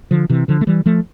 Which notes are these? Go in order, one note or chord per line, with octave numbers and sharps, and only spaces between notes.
D3 F3
C3 E3
D3 F3
A3
E3 G3
F3 A3